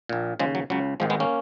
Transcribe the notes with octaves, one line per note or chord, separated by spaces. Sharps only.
A#1 A#2
D#2 C#3 F3 G#3
F#3
C#2 C#3 F#3
G#1 G#2 D#3 F3 G#3
G#3 B3
A#3 C#4